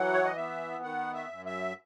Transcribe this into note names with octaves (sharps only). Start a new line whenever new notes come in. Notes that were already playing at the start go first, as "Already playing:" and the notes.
Already playing: E3 F#3 F#5
C#5
D#5
B3 E5
D#3 F#5
E5
F#2
E5